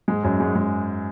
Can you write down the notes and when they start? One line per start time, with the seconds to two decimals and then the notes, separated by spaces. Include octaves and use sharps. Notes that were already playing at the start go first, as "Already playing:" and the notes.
0.08 G#2 G#3
0.23 F#2 F#3
0.40 G#2 G#3
0.55 G#2 G#3